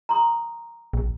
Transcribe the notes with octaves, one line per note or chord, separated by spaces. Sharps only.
A#5 C6 D#6
A#1